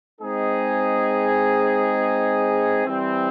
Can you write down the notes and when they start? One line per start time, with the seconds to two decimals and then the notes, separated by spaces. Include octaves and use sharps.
0.21 G#3 C4 D#4 G#4
2.86 E3 G3 C4